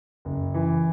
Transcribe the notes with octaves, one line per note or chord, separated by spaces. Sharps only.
F#1
E3